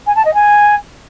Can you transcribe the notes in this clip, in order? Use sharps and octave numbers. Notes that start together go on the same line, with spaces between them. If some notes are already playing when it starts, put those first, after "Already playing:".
G#5
A5
D#5
G#5